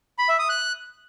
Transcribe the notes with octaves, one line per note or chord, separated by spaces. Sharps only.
B5
E5
D#6
F#6